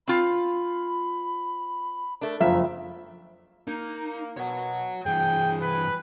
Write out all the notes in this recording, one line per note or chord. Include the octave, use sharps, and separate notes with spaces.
C4 F4 B5
A3 D4 A#4
F#1 F2 E5 F5 A#5
A#3 D#4
B2 C#5 F#5
G2 E3 G#4 G5
B4